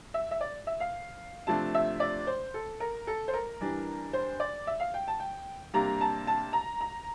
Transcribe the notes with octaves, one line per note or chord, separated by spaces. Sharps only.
E5
E5
D5
E5
F5
C3 F3 A3 D4 A5
E5
D5
C5
A4
A#4
A4
C5
A#4
E3 G3 D4
C5
D5
E5
F5
G5
A5
G5
C3 G3 A#3 D4 A#5
A5
A5
A#5
A#5